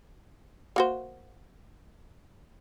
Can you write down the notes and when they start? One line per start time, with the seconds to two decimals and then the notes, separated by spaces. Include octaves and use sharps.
0.76 A#3 F#4 C5